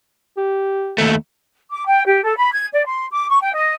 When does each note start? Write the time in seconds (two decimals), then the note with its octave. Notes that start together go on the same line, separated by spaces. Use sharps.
0.37 G4
0.98 D#2 A3
1.70 D6
1.86 G5
2.06 G4
2.23 A4
2.36 B5
2.52 G#6
2.72 D5
2.86 C6
3.11 D6
3.29 C#6
3.42 G5
3.53 D#5